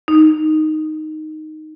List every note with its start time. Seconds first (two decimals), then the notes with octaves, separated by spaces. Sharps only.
0.08 D#4